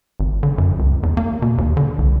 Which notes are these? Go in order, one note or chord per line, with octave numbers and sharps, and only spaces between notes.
G#1
D3
F#2
C#2
E2
A#3
B2
D#2
D3
C2